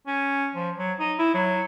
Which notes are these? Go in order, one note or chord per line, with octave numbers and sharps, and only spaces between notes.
C#4
F3
F#3
D#4
E4
F#3